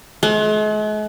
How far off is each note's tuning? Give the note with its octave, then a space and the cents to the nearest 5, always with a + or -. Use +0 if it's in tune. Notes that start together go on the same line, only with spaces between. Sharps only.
G#3 +45